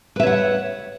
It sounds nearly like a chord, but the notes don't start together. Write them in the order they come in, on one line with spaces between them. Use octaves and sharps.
B4 E5 C#5 F#5